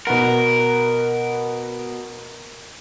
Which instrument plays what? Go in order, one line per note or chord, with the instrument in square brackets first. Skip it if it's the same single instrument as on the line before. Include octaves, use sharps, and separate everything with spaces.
[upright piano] B2 B4 F#5 [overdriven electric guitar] A#4